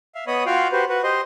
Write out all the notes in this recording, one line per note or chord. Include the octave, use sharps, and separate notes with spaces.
E5 F5
B3 C#5 D#5 B5 D#6
F4 F#4 F5 G5
F#4 G4 B4 C5
F#4 B4 F#5
G4 C5 D#5 C6